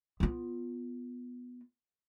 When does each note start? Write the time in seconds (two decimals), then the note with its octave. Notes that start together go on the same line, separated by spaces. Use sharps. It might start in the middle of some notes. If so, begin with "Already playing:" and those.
0.20 B3 F4